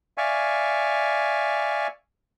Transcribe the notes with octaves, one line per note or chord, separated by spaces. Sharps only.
D5 E5 F5 G#5 C#6